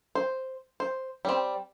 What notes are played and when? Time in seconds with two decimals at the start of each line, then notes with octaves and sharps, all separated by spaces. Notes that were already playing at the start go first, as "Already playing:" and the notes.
0.15 C5
0.80 C5
1.25 G3 C4